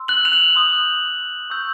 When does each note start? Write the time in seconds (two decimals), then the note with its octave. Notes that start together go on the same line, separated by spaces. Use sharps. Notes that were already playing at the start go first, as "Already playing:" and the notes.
Already playing: C6 E6
0.08 F#6 F#7
0.25 F7
0.32 F#6 F#7
0.55 C6 D#6 G6
1.50 C#6 E6 G6